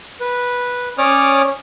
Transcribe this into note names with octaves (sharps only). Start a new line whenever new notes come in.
B4
C#4 C#5 D5 D6 D#6 F6